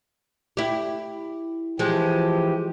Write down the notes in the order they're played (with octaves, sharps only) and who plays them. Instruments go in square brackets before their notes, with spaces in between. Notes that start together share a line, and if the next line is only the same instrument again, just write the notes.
[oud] E4 G4
[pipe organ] E3 G4 [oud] F3 G#3